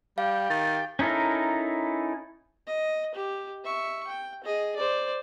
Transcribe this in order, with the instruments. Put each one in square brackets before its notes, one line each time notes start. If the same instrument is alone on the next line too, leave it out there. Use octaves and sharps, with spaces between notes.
[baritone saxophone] G3 [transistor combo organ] G4 G5 [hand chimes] F5
[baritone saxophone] D#3 [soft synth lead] A6
[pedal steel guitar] C#4 D#4 E4 A4 A#4
[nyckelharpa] D#5
G4
E5 C#6
G5
G#4 D#5
C5 D5